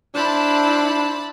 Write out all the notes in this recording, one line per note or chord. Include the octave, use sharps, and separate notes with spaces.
D4 E4 C5 A5 B5